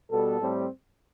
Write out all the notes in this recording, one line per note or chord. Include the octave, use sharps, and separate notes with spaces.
B2 G3 B3 A4
A2 G3 C4